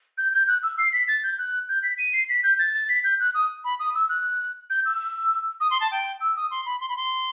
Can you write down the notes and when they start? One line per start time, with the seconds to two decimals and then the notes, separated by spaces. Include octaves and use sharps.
0.18 G6
0.33 G6
0.48 F#6
0.63 E6
0.79 C7
0.93 B6
1.08 A6
1.23 G6
1.39 F#6
1.69 G6
1.83 B6
1.98 D#7
2.13 C7
2.29 B6
2.43 G6
2.59 A6
2.74 A6
2.89 B6
3.04 G6
3.20 F#6
3.34 D#6
3.64 B5
3.80 D#6
3.95 E6
4.09 F#6
4.70 G6
4.85 E6
5.61 D#6
5.71 C6
5.81 A5
5.91 G5
6.21 E6
6.36 D#6
6.51 C6
6.66 B5
6.81 C6
6.89 B5
6.97 C6